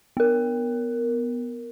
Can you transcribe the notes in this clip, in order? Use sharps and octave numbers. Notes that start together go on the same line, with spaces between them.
B3 A#4